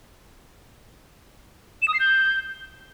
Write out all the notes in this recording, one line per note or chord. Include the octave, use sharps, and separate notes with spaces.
E7
D#6
C7
G6